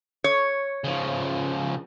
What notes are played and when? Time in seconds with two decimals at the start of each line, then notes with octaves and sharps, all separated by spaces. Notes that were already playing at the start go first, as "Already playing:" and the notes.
0.24 C#5
0.84 C#3 F3